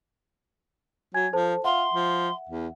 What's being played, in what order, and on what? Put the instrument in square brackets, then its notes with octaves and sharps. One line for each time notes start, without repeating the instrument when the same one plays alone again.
[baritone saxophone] F#3 [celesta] G#5 G#6
[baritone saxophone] F3 [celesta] A4 C5 A5
[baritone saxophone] F4 [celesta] E5 F#5 [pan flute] C6
[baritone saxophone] F3
E2